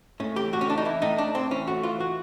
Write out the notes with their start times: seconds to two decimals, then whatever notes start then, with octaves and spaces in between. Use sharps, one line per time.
0.20 A2 C#4
0.36 E3 G4
0.53 A2 F#4
0.61 C#4
0.69 E3 D4
0.78 D#4
0.85 E3 E4
1.02 A2 D#4
1.18 A2 D4
1.35 A2 C4
1.51 E3 C#4
1.67 A2 F#4
1.83 E3 F4
2.00 E3 F#4